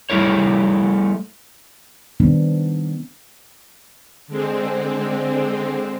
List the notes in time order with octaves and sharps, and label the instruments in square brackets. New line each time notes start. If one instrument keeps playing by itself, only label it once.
[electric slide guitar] G3 A3 E4 A#4 C#5
[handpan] D#3 G3 B3 C4 D4
[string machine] D3 G#3 C4